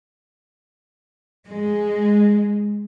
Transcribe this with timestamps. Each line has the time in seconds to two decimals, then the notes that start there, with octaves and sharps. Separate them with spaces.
1.47 G#3